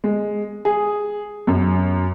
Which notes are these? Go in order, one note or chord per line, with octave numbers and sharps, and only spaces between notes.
G#3
G#4
F#2